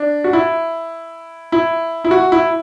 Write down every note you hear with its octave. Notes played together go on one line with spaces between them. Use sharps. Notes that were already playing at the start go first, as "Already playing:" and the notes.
Already playing: D4
F#4
E4
E4
E4
F#4
E4